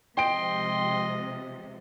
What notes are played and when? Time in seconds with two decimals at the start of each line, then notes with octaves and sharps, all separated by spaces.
0.17 C3 F3 G#3 D#5 G5 C6 D7